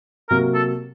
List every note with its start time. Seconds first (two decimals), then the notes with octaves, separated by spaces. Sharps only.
0.30 C3 F#3 A#3 A#4
0.55 A4